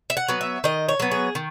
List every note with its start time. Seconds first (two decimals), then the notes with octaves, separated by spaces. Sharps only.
0.10 E5
0.17 F#5
0.28 F#3 B3
0.41 E5
0.64 D#3 D#5
0.89 C#5
1.00 F#3 B3
1.11 G#4
1.35 D#3